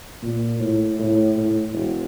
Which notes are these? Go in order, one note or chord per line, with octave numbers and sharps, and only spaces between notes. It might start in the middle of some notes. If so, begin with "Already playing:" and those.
A#2
A2
A2
A2
E1